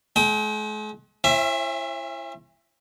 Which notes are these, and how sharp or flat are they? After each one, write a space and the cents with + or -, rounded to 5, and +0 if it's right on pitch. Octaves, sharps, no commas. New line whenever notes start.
G#3 +45 G5 +0 D#6 +45
C#4 -45 E4 +35 E5 +0